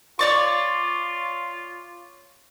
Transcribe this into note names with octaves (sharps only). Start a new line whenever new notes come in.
F4 C#5 D5 C#6